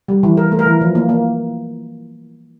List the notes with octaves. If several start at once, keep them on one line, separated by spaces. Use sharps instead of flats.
G3
E3
E3 A#4
A3
A#4
E3
F3
A#3
A#3